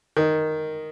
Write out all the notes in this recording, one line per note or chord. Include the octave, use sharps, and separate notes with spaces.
D#3